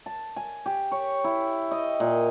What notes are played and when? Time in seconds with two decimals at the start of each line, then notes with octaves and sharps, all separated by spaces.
0.06 A5
0.36 G#5
0.66 G4
0.92 C#5
1.24 E4
1.71 D#5
2.00 A#2